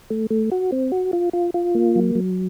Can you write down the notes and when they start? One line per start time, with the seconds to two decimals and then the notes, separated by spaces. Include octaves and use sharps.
0.10 A3
0.30 A3
0.52 F#4
0.72 C4
0.92 F#4
1.13 F4
1.33 F4
1.54 F4
1.75 A#3
1.96 F#3
2.15 F#3